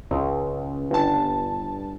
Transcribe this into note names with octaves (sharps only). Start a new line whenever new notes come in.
C#2
G1 A5